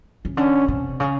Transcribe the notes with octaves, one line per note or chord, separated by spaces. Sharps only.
C#3
D3 C#4
C3
C#3